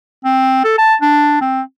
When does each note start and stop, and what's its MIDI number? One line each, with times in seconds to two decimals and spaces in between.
0.24 0.62 60
0.64 0.76 69
0.78 0.95 81
1.02 1.38 62
1.41 1.62 60